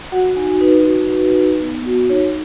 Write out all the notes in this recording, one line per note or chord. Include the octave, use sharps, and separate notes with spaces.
F#4 F#5
D#4 G#5
D#4 B4
F#4
D#4
D#4
B3
F#4
D#4 C#5